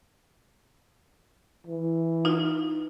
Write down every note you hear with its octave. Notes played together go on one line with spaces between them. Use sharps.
E3
D#4 F4